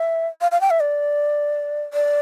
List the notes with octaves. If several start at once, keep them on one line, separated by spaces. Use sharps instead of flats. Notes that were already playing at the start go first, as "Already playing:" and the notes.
Already playing: E5
F5
F5
G5
E5
D5
D5